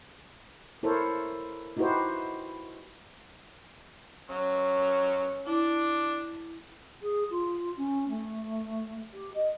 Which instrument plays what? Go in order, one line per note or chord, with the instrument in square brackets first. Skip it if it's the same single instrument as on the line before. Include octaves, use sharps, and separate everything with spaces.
[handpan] E4 A4 A#4 C5 C#5
D#4 E4 F#4 G4 B4 C5
[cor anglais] F#3 [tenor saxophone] C#4
[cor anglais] D4 [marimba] E4
[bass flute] G#4
F4
C#4
A3
G4
D#5